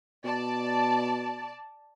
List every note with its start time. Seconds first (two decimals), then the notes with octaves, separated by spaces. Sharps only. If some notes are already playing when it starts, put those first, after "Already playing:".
0.24 B2 D5 A5